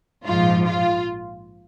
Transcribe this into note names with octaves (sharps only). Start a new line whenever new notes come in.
A#1 G#2 F3 F4
F4